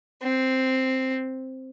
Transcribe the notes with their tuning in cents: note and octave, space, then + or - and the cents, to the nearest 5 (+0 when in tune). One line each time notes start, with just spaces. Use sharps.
C4 +0